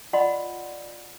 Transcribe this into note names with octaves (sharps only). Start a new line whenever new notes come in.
F4 D5 D#5 F#5 B5 C6